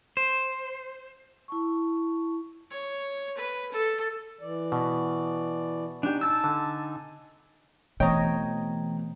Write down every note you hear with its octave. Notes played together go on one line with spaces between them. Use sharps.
C5
E4 A5 C#6
C#5
B4
A4
E3 D5
B2
D4 D#4 G4 G#5
A5 E6
D3
B2 E3 A3 C4 C#5 D#5 G5 A#5